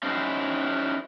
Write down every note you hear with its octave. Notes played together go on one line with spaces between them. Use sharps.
C#4 D#4 E4 F#4 C5